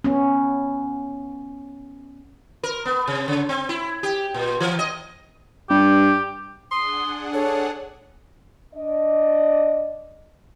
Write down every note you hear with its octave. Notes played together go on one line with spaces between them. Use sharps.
B3 C#4
A#4
B3
C3
C#3
C4
E4
G4
A#2
E3
D#5
G2 G4
D4 G#4 F#5 C6 D#6
A4 C#5
D4 D5 D#5